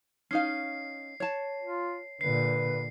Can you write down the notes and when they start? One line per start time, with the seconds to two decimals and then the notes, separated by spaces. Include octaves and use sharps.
0.31 C#4 D#4 F5 C7
1.20 C#5 A5
1.62 F4
2.21 A#2 D3 B4 C7